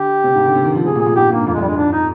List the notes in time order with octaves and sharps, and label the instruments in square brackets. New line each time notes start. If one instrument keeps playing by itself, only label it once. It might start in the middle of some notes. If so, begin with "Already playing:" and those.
Already playing: [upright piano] D3 [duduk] G4
[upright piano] C3
G#2
D3
C3
D#3
F3
[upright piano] C3 [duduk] G#4
[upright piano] A#2
[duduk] G#4
[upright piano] A#2
[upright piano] G#2 [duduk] G4
[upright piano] G2 [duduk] A#3
[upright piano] F2 [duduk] A#3
[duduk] G#3
[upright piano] F2
[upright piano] G2 [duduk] G3
[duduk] G#3
[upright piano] G#2 [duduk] D4
[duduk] D#4